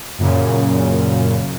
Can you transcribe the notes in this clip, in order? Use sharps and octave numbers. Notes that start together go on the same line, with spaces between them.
F#2 A#2 C#3